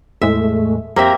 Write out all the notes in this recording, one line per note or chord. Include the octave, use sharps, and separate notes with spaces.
E2 A2 G#3 A3 E5
F2 A#3 C4 G4 E5 A#5